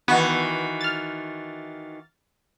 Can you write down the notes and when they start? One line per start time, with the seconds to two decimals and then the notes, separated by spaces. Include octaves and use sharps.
0.08 D#3 E3 B3 F#4
0.81 F6 A6